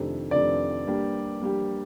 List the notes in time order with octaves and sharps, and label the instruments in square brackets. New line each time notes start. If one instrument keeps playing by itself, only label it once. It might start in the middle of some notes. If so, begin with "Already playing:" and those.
Already playing: [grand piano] F2 C3 D#3 A3 D4
[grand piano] F2 C3 D#3 A3 D4 [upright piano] D5
[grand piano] G3 A#3 D4 G4
G3 A#3 D4 G4